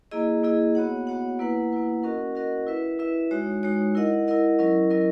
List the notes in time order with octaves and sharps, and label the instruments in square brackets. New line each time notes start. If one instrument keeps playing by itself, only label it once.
[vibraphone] A#3 E4 G#4 D#5
A#3 E4 G#4 D#5
B3 F#4 C#5 F#5
B3 F#4 C#5 F#5
A#3 E4 B4 F#5
A#3 E4 B4 F#5
C#4 F#4 A#4 D#5 F#5
C#4 F#4 A#4 D#5 F#5
E4 B4 E5
E4 B4 E5
G#3 D#4 F#4 C#5
G#3 D#4 F#4 C#5
E4 A#4 D#5 F#5
E4 A#4 D#5 F#5
F#3 C#4 E4 A#4 D#5
F#3 C#4 E4 A#4 D#5